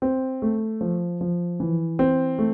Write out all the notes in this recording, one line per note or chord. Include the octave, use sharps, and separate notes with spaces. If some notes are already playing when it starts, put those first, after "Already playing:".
C4
A3
F3
F3
E3
C4
A3